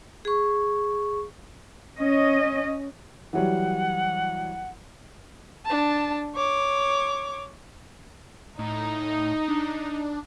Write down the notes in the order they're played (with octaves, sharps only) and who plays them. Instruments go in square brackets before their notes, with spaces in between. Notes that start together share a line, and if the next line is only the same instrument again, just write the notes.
[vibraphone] G#4 C#6
[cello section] C#4 D#5
[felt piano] E3 F#3 G3 [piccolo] F#5
[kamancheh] D4 A5
C#5 D6
[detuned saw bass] A2 [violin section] D#4
[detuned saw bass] D4